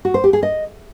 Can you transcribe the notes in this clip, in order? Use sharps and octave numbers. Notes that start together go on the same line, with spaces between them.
F#4
C5
G4
G#4
D#5